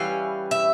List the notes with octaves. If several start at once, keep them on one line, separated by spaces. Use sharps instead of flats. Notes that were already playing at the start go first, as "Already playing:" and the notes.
Already playing: E3 G3 C#4 F5
E5